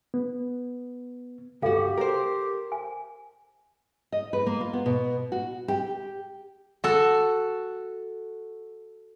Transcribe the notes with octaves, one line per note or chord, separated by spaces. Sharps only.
B3
C#2 G2 F#4 G4 A4 F5 G5
A#4 C5
G#5
D#5
B4
A#3
F4
B3
B2
F#4
G4
F#4 A4